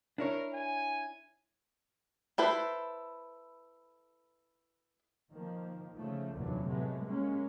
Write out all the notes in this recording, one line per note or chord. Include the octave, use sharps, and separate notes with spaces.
D4 E4 A#4 C#5
G#5
E4 A4 B4 C5
D#3 F3 A#3
C#3 F3 A3
F1 D#2 A#2 D3 E3 F#3
A2 C3 F#3 G#3 A3 B3
G#3 A#3 C#4